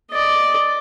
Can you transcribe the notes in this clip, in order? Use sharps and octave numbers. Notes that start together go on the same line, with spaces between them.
D5 D#5